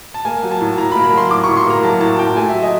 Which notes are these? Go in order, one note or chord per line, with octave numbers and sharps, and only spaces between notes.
A5
A#3 G#5
F#3
A5
A2
A2 A#5
B5
A#3
B5
F#3 C6
A2 D6
A2 C#6
C6
A#3 A#5
F#3 A5
A2 A5
A2 G5
A3 G#5
F#3 E5
D#5